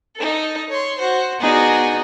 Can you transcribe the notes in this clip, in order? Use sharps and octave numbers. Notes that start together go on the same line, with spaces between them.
D#4 A4
C#5 C6
F#4 C5
B3 D#4 F#4 G#4 D5